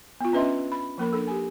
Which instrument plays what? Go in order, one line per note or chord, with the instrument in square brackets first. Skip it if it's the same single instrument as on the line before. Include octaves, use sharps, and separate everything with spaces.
[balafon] B3 F4
C#4 D4 B4 D#5 E5 C6
B5
F3 A#3 A#4 B5
D4 A4
G4 G#5